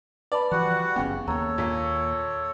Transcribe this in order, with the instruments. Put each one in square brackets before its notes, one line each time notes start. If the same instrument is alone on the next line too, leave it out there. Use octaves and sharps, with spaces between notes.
[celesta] B4 A5 B5 [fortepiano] D5
[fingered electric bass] E3 F3 [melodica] G3 F#4 F#5
[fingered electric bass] F#1 B3 [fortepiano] C#3 [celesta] G5
[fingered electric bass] D#2 A#3 [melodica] A4 C#5 [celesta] A#5
[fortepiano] A#2